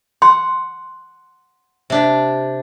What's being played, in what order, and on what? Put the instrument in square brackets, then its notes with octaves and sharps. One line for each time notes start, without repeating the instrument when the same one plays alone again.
[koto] F#5 [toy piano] C6
[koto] C3 D4 G4